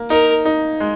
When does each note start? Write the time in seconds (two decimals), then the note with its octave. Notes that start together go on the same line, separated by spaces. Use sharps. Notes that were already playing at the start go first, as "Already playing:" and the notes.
Already playing: A#3
0.10 D#4 A#4
0.45 D#4
0.80 G#3